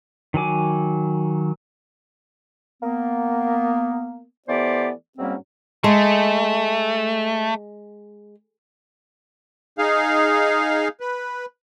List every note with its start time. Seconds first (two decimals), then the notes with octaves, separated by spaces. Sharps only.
0.34 D#3 F#3 G#5 D6
2.83 A#3 B3
4.48 E3 A3 B3 G4 C5 D5
5.18 G#2 F#3 G3 A#3 C4 C#4
5.84 G#3 A3
9.78 D#4 G#4 F5
11.00 B4